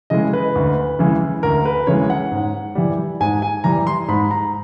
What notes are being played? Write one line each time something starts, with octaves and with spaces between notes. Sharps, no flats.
C#3 E3 G#3 D#5
B4
D2
C#3 E3 G#3
D2 A#4
B4
C#3 E3 G#3 C#5
F#5
G#2
E3 G3
G#2 G#5
G#5
E3 G3 A#5
C6
G#2 B5
A#5